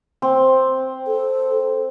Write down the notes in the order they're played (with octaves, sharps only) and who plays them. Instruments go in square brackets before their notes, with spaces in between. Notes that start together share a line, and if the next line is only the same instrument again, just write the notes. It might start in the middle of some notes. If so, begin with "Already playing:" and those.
[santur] C4
[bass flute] A4